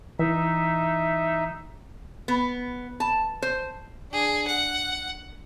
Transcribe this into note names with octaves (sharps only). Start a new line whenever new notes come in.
E3 D#4 E5
B3
A5
C5
D4 G#4
F#5